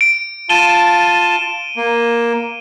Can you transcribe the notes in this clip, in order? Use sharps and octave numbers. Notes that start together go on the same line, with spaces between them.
D7
F4 A5 D#7 E7 G7
A#3